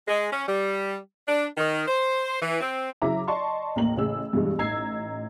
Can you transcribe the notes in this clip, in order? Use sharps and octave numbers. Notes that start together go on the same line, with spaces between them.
G#3
C#4
G3
D4
D#3
C5
E3
C4
C#3 F#3 E4 E5 A#5 D6
D5 D#5 A5 C6 C#6
A1 D#2 A#3 A#5 F#7
A1 C#3 G#4 E6
G2 B2 E3 G3 G#3
A1 D#4 A#5 E6 G#6 C7